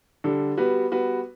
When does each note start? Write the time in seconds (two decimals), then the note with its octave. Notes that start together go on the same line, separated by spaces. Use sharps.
0.24 D3 G3 D4 A4
0.57 G3 B3 F#4 B4
0.91 G3 B3 F#4 B4